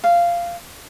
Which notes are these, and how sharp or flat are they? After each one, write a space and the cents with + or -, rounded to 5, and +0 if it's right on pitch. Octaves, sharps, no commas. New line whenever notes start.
F5 -15